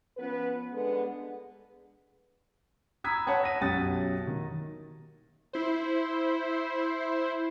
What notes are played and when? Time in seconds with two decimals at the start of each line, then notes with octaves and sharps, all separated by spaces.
0.17 F3 B3 C#4 B4
0.73 D3 G#3 B3
3.04 A#5 B5 D#6 E6 G#6 B6
3.27 C#5 F#5 A5 D#6 G#6
3.44 A#6 B6 D#7
3.61 B1 F#2 G4 D#6 A6
4.27 D#3
5.53 E4 C5